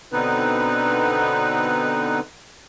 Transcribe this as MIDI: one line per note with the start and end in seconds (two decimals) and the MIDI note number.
0.12 2.20 47
0.12 2.20 50
0.12 2.20 59
0.12 2.20 60
0.12 2.20 63
0.12 2.20 71